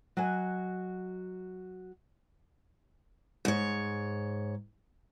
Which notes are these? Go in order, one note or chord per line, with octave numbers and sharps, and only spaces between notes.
F#3 F#4 D#5 G#5
G#2 C#5